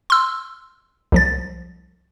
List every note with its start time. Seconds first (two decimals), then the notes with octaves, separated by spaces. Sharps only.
0.10 C6 E6
1.12 C2 F3 A6